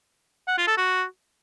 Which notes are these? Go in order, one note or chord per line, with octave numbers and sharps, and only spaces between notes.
F#5
F4
A4
F#4